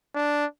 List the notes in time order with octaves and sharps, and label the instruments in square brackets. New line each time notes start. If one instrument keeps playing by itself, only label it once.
[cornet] D4